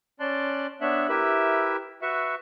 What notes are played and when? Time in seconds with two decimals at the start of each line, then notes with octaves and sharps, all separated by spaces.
0.20 C#4 D5 A5 C6 F#6
0.81 B3 D4 C#5 E5 F#6
1.09 E4 G4 A#4 B4 E5
2.02 F#4 B4 E5 C#6